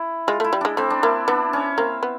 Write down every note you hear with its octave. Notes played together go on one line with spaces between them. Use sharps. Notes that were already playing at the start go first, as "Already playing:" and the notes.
Already playing: E4
G#3 F4
A3 E4
G3
G#3 D4
A3 C4
D4
A#3 E4
B3 D4
C#4
A#3 C4
B3